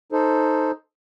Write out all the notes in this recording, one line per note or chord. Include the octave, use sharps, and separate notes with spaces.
D#4 A4 C5